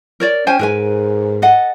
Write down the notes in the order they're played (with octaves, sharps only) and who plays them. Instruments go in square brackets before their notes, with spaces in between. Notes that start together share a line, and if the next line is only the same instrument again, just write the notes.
[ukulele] A#4 C#5 D5
[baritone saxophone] C#4 [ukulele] C5 G5 G#5
[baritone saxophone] G#2 [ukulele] A#4 B4 G#5
[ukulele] A4 D#5 F#5